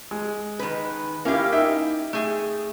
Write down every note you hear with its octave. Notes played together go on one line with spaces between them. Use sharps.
G#3
D#3 B4
A#3 C#4 E4 G4 F5
D#4 E5 G5
A3 G#4